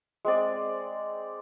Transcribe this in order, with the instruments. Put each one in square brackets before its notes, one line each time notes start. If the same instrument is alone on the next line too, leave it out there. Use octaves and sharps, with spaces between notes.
[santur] G#3 C4 D5